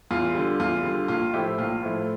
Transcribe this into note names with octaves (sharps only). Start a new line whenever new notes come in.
E2 F4
D3 G3
E2 F4
D3 G3
A#1 F4
A2 F3 A3 E4 G4
A#1 F4
A2 F3 A3 E4